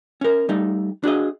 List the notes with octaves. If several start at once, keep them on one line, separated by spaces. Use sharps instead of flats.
C#4 A#4
G3 A3 D#4
D4 F#4 G#4 D#5